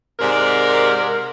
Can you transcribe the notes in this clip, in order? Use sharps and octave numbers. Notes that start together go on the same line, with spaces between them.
G#2 C3 A#4 D5